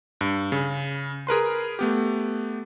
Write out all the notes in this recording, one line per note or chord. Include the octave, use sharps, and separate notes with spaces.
G2
C#3
G#4 A#4 B4 C6
A3 B3 G4